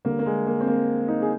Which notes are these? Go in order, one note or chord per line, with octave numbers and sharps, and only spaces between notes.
D3 G3 A#3
A#3
G#3
A#3
C4
A#3
D#4
G#4